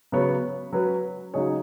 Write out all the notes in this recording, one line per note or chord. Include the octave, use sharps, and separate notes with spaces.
C#3 F#3 B3 F#4 C#5
F#3 C#4 B4
C#3 F#3 D#4 G#4 C#5